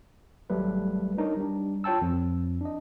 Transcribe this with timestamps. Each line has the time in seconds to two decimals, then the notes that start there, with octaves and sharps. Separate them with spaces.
0.50 G#1 F#3 G3 A3 B4
1.17 D4 D#4 A#4 C#5
1.37 G3 D4
1.84 F4 C#5 G5 A5 E6
2.02 F2
2.61 D4 D#5